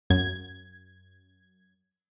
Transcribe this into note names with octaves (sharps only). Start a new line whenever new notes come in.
F#2 G#6